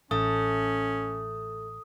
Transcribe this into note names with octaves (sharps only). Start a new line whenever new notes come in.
A1 A3 C#4 D#6